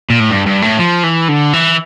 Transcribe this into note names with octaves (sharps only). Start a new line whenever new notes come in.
A#2
A2
G2
G2
A2
F3
E3
D3
E3